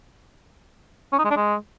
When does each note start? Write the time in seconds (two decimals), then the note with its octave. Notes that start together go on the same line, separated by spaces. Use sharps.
1.13 C#4
1.19 D#4
1.25 G#3
1.31 D4
1.37 G#3